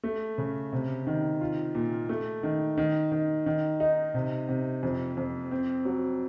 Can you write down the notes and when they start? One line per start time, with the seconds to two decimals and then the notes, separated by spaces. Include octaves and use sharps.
0.03 A3
0.38 C#3
0.73 C3
1.07 D#3
1.41 F4
1.75 A#2
2.09 A3
2.43 D#3
2.77 D#3
3.12 D#3
3.46 D#3
3.80 D#4
4.14 C3
4.49 C3
4.83 F2
5.17 F2
5.51 C4
5.85 F#3